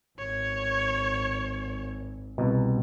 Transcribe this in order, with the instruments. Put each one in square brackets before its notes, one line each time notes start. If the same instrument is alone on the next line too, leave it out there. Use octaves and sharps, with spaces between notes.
[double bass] G#1 [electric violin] C#5
[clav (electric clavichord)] C2 B2